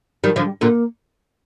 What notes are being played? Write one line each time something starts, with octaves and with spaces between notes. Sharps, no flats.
D#3 F3 G3
D3 F3
G3
A#2 D3 A#3